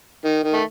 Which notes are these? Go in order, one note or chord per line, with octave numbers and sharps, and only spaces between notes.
D#3
D#3
A3